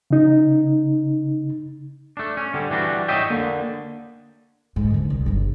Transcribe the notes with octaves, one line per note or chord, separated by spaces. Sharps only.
C#3 D#4
A3 D4
C#4
D3 G3 C4
E3 G3 D4 F#4
C#5 D#5 E5 G5
D3 A#3
G#2
D#2 D3
C2
G1 E2